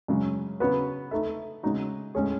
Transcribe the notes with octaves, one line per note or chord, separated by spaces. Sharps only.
F#2 C#3 G#3
C#3 F#3 B3 F#4 B4
A3 D#4 A4 E5
C#3 G#3 D#4 F#4
A2 G#3 C#4 G#4 C#5